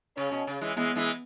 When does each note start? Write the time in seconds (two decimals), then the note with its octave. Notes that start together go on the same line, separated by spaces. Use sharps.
0.18 C#3 C#4
0.32 B2
0.47 C#3
0.61 E3 G#3
0.76 E3 G#3 B3
0.96 E3 G#3